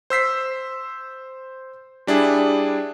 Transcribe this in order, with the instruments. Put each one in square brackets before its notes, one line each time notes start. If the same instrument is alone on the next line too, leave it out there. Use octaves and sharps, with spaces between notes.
[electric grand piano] C5 E6 B6 C7
G3 D4 E4 G#4